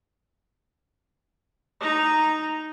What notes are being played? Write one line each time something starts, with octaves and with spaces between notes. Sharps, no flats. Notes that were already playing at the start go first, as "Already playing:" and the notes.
D#4 A#5